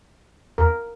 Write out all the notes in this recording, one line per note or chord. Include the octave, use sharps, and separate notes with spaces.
E2 A#4